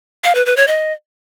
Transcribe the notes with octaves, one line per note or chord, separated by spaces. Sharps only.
F5
B4
B4
C#5
D#5